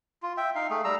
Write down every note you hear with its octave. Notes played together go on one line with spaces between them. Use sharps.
F4
E5 G5
D#4 F5
A3 G#4
G3 A#5 E6